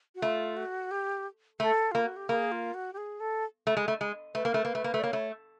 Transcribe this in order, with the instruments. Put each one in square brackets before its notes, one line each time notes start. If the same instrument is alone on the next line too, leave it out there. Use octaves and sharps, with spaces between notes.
[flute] F#4
[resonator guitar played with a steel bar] A3 [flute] F4
[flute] F#4
G4
[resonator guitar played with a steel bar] A3 [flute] A4
[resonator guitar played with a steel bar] A#3 [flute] F4
[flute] F#4
G4
[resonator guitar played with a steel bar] A#3 [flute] G#4
[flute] F4
F#4
G4
G#4
A4
[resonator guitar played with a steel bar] A3
G#3
A3
G#3
[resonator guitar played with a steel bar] A3 [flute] B4
[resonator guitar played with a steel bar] A#3 [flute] A#4
[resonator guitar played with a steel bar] A3
[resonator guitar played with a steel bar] A#3 [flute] B4
[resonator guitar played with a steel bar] A3
A#3
A3
[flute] D5
[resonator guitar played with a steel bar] A#3 [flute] C#5
[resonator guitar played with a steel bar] A3